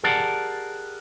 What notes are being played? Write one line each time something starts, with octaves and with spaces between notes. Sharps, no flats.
G4 G#4 A#4 D5 F#5 A5